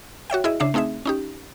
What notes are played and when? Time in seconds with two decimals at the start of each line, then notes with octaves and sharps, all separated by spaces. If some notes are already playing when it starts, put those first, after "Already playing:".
0.30 F#4 C#5 E5 G5
0.44 E4 G#4 D#5 E5
0.60 C#3 D4 E5 C7
0.74 A3 C4 D#4 G#4 E5
1.05 C#4 D#4 G4